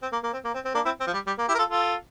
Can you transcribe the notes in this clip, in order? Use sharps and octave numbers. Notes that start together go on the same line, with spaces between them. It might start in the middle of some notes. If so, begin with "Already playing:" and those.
C4
A#3
A#3
C4
A#3
C4
C4
A#3 D4
C4 E4
C4
F3
G3
G3
A#3
E4 G4
A#4
F4 A4
F4 A4